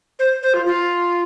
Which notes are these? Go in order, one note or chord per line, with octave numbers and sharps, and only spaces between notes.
C5
C5
F4
F4